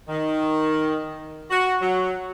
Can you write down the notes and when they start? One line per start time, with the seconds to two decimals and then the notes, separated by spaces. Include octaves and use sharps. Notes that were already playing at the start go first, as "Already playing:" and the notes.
0.08 D#3
1.50 F#4
1.82 F#3